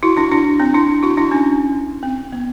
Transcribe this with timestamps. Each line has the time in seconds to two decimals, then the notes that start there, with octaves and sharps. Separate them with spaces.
0.03 E4 F#4
0.17 D4 E4
0.32 D4 E4
0.60 C4 D4
0.74 D4 E4
1.03 E4 F#4
1.17 D4 E4
1.31 C#4 D#4
2.03 C4
2.32 B3